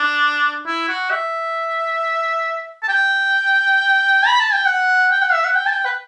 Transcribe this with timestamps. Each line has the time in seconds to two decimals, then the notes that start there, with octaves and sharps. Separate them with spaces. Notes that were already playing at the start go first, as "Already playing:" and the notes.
Already playing: D4
0.66 E4
0.89 F#4
1.11 E5
2.83 A5
2.89 G5
4.27 B5
4.40 A5
4.53 G5
4.66 F#5
5.11 G5
5.22 F#5
5.33 E5
5.45 F#5
5.55 G5
5.66 A5
5.71 G5
5.85 B4